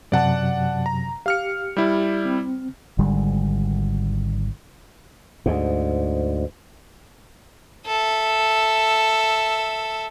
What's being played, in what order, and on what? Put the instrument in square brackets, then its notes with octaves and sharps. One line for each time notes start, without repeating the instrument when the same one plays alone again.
[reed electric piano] F#2 C3 F#3 [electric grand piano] D5 F#5 A5
[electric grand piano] A#5
[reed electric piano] G4 [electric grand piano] F5 F6 C#7
[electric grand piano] G3 E4 D5
[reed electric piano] C4
[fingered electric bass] G#1 D3 G3 G#3
[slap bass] D2 G#2
[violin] A4 E5